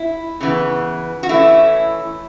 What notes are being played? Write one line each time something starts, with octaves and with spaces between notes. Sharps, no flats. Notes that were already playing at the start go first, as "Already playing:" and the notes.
Already playing: E4
C#3 E3 B3
F#4
E3 A3 C#4 E4